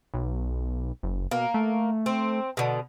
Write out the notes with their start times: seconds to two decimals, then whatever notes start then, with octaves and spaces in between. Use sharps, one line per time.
0.14 B1
1.03 F#1
1.31 B2 A#3
1.54 A3
2.06 C4
2.57 B2 D3